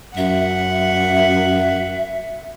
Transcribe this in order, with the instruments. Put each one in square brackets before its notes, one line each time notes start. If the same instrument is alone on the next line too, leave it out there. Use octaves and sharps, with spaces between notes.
[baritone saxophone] F#2 [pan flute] E5 [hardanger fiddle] F#5